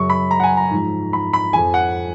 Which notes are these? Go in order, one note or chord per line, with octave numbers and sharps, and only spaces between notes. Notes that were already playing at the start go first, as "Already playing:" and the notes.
Already playing: F#2 C#3 F#3 C#6
B5
A#5
F#5
G#5
A#5
G#2 F3
B5
B5
F2 F3 G#5
F#5